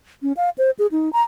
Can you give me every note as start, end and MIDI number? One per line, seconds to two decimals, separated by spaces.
0.22 0.32 61
0.37 0.50 77
0.58 0.71 72
0.79 0.87 68
0.92 1.12 63
1.13 1.22 82